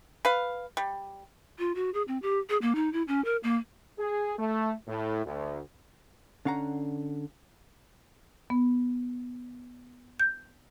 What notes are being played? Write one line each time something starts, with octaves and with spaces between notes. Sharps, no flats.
B4 F5
G3
F4
F#4
G#4
C4
G4
G#4
A#3
D#4
E4
C#4
A#4
A#3
G#4
A3
A2
D2
D3 C#4 F5 F#5 A#5
B3
G6